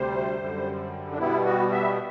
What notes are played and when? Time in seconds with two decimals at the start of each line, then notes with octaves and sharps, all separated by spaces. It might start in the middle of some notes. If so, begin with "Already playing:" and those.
Already playing: D2 C3 G3 C5
0.37 F#2 D3 G3
1.12 D4
1.19 B2 G3 B3 E4
1.45 F#4
1.72 E5